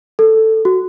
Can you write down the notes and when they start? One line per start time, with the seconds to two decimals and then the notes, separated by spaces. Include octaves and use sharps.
0.19 A4
0.65 F#4